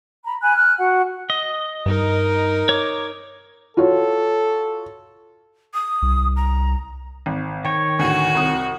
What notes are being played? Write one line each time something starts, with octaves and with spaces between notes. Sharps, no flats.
A#5 B5
G#5 B5 F#6
F6 F#6
F#4 F#5
D#5
G2 D#4 A#4
C#5 D6
F4 F#4 A4 C#5
D#6
C2
A#5
G#1
D#3 C#5 G5
D2 A2 F#4
C2 D#6